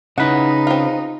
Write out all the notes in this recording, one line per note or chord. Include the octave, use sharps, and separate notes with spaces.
C#3 D#4 E4 B4 F#5
C4 F4